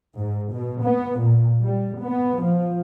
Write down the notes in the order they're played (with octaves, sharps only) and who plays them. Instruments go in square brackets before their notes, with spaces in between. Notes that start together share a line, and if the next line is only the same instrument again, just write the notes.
[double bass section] G#2
B2
B3
A#2
G3
B3
F3